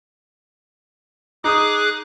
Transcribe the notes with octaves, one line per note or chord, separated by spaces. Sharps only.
D#4 G#4 D6 D#6 F#6